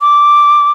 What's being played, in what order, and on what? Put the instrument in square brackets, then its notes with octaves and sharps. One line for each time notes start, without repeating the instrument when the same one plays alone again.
[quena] D6